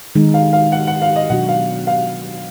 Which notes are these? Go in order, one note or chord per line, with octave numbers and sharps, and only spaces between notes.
D#3 G#3 D#4
F5
F5
F#5
F#5
F5
D#5
B2 F#3 D4 F#4 F#5
F5
F5